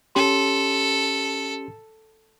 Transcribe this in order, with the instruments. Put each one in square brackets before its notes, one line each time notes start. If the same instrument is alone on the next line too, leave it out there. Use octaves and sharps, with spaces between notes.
[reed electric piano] C#4 G4 C6 [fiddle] A4